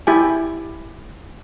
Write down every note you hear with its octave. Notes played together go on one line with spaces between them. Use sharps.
E4 G4 G#5